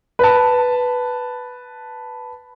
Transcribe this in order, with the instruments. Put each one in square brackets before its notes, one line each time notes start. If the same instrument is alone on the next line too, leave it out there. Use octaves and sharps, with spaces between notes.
[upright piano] B4 A5